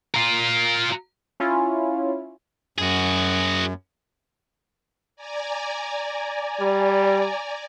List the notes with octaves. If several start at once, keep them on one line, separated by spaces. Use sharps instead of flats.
F4 A#4
C#4 E4 F4
F#2 F#4 G#4
D5 G#5 A#5
G3